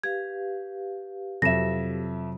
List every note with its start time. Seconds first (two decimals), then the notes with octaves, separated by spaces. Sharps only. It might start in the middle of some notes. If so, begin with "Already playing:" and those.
0.04 G4 B4 F5 G#6
1.42 F2 C3 F#3 E5 A#6 E7